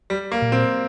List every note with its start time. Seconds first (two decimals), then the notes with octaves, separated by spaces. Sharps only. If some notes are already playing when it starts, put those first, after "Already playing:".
0.10 G3
0.32 A#3
0.42 A#2
0.52 C4